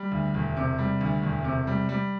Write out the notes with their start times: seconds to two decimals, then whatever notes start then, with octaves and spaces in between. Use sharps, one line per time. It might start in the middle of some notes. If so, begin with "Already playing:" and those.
Already playing: G3
0.11 D2
0.34 E1
0.56 C3
0.78 G3
1.01 D2
1.23 E1
1.44 C3
1.67 G3
1.89 G3